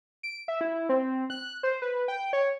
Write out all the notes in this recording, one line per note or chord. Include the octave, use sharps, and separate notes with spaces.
D7
E5
E4
C4
F#6
C5
B4
G5
C#5